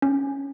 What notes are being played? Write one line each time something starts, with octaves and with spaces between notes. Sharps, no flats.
C#4